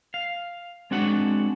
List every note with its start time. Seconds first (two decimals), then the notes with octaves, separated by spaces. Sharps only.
0.14 F5
0.91 G#3 C4 D4 F#4 F#5